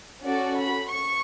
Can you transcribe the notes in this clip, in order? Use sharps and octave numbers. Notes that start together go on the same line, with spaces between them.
C#4 F#4 A4 D5
B5
C#6